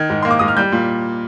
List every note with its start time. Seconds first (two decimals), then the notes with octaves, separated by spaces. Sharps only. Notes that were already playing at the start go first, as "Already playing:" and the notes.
Already playing: D#3 G#6
0.10 G#2
0.22 A#3 C6
0.31 D6
0.39 G#2 D#6
0.48 F6
0.57 G3 G6
0.72 A#2